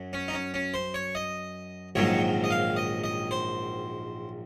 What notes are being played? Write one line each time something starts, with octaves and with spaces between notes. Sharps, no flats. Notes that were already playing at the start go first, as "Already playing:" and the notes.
Already playing: F#2 F#3
C#4
D#4
C#4
C#4
C5
C#5
D#5
A#1 G#2 D#3 F#3 C#5
D#5
F5
D#5
D#5
C5